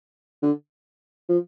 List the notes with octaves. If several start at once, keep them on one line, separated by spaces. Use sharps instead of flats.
D3
F3